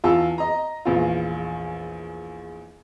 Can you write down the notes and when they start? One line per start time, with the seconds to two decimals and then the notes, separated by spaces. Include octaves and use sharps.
0.04 E2 F4 A5 E6
0.38 D#5 A#5
0.85 A#1 E2 G#3 F4